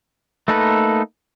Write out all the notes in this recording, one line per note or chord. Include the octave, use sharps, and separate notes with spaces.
A3 A#3 D#4 A4 B4